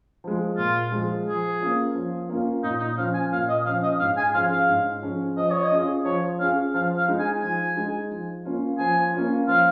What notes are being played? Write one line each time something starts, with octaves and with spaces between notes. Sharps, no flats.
F3 G#3
A#2 F4
F3 G#3
F3 G#4
A#3 C#4 F4
F3
A#3 C#4 F4
A#2 D#4
D#4
F3 C#4 F5
G#5
A#2 F5
D#5
F3 C#4 F5
D#5
G#2 F5
G#5
F3 C#4 G#4 F5
F5
G#2
F3 C#4 G#4
F3 D#5
C#5
D#5
C#4 F4 G#4
F3 C#5
C#4 F4 G#4 F5
F3 F5
F5
G#3 D#4
G#5
F3 G#5
G#3 D#4
F3
A#3 C#4 F4
F3 G#5
A#3 C#4 F4
F3 F5